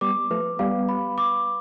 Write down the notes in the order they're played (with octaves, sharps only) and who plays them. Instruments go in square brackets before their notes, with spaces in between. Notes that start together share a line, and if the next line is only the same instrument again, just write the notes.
[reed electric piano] G3 B3 [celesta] D6
[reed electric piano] F3 A3 [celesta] B4
[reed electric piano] G3 B3 [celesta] F5
[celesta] B5
D6